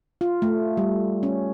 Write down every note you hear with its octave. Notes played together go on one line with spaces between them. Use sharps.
F4
A3
G3
C#4